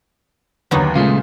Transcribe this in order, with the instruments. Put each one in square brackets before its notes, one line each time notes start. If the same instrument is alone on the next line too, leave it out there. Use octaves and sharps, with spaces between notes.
[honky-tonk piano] D#2 D3 [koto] F#3 B3 D#4
[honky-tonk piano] A#2 F4 [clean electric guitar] C#3 G#3 A3